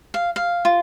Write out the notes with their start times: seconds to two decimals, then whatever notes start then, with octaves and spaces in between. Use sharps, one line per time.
0.14 F5
0.36 F5
0.65 F4